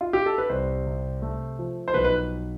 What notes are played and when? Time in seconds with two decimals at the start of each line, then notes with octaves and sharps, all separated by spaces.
0.01 F4
0.13 G4
0.26 A4
0.38 B4
0.50 C2 C5
0.86 C3
1.22 A3
1.59 F3
1.88 C5
1.94 B1 B4
2.04 B4